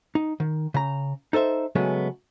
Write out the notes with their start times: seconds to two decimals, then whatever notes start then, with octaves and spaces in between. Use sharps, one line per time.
0.15 D#4
0.40 D#3
0.74 C#3 A#5
1.33 D#4 A4 C5 E5
1.75 C#3 F#3 G#3 A3 B3 C#4